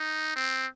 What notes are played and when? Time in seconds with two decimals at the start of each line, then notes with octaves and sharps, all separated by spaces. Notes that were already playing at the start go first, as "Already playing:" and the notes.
Already playing: D#4
0.36 C4